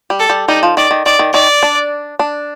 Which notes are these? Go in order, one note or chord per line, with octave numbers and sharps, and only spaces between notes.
G3
A4
G3
G3 D#4
F3
D#3 D5
D#3
D#3 D5
D#3
D#3 D5
D4
D4